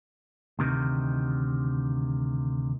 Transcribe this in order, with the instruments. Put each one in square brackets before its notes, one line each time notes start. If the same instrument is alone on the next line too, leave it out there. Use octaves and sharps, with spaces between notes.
[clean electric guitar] D2 C3 D#3